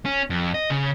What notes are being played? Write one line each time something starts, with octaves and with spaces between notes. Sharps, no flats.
C#4
F2
D#5
C#3